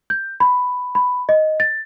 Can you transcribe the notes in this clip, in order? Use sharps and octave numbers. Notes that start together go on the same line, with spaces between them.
G6
B5
B5
D#5
A6